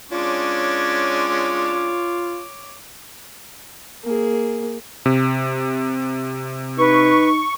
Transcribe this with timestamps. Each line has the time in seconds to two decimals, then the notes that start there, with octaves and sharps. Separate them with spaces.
0.12 G#3 C#4 D4 F4 C#5 D6
4.04 A#3 G#4
5.06 C3
6.78 D#4 B4 C#6